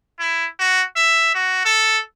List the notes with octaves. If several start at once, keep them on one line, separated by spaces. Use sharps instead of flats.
E4
F#4
E5
F#4
A4